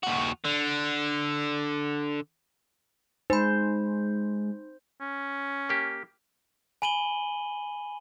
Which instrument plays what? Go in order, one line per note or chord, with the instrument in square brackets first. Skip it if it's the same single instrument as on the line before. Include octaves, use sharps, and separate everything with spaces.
[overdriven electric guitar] D#2 F#4
D3
[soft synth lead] G#3 [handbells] D#4 B5 [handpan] C5
[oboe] C#4
[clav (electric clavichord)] A#3 G4
[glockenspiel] G#5 B5 D#7 F#7 G7